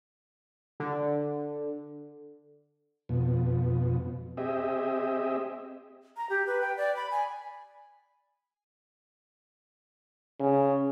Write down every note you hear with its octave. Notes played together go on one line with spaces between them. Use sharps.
D3
F2 B2
C4 G4 G#4 D#5 E5
A#5
G4
B4
G5
D5
B5
G#5
C#3